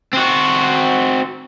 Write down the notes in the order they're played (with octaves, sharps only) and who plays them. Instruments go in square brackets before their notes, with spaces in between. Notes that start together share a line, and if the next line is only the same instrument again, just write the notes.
[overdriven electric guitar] C4 F#4